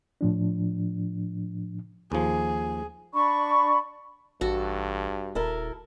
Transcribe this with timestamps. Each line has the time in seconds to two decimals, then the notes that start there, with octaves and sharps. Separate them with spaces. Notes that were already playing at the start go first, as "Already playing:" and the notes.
0.21 A2 F3 D4
2.12 D#2 F3 G#4
3.14 D4 D5 B5 C#6
4.41 A1 G2 F#4 A4
5.35 D#1 E4 A4 A#4